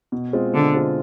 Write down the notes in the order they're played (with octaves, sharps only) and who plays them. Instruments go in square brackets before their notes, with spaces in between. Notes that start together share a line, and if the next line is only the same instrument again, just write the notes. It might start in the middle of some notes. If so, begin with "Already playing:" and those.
[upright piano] B2
G#3 C4 F4
[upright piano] B2 [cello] D3
[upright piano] G#3 C4 F4